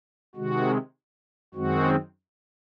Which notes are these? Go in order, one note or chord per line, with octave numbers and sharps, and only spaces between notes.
C3 D#3 G#3 F#4
F#2 D#3 G#3 C4 F#4